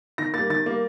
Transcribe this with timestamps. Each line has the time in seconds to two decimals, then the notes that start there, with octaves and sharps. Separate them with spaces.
0.18 D#3 A#6
0.34 G3 A#3 A6
0.49 D#3 A6
0.66 G3 A#3